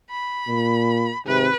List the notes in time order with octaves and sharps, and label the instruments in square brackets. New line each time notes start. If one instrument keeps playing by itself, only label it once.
[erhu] B5
[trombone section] A#2
[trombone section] G#1 G#2 C3 [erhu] B4